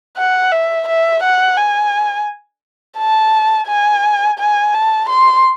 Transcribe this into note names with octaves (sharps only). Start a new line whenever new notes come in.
F#5
E5
E5
F#5
G#5
A5
G#5
G#5
A5
C6